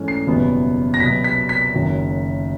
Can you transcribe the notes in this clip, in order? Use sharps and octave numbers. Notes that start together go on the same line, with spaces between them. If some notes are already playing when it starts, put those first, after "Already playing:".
Already playing: G#2 E3 A3 C#4
C7
F#1 E2 B2 G3 B3
A#6
C2 B2 F#3 B3 B6
B6
B6
F#1 F#2 D#3